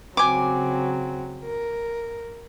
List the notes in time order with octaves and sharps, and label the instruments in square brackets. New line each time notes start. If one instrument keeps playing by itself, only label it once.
[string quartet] C#3 F#3 C4 [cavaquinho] G#5 D6
[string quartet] A#4